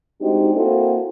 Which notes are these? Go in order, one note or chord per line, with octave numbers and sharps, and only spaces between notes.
G#3 C4 D4 D#4 F#4 G4
A#3 C4 E4 F#4 A4